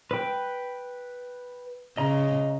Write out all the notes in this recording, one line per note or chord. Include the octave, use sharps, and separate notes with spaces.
B4 G5
C#3 D#5 A#5